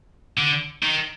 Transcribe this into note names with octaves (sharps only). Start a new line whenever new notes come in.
D3
D#3